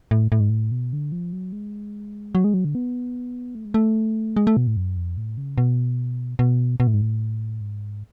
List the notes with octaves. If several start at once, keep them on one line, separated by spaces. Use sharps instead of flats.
A2
A2
G#2
A2
B2
D3
F3
F#3
G#3
F#3
G#3
F#3
D3
B3
A3
G#3
A3
G#3
A3
B2
A2
F#2
F2
A2
C#3
B2
B2
B2
A2
G#2
A2
G#2